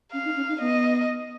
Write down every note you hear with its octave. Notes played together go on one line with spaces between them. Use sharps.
C#4 F5
D#4
C#4
D#4
B3 D#5